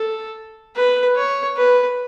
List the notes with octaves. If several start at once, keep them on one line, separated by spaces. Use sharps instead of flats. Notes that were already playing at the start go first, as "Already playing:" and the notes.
Already playing: A4
B4
C#5
B4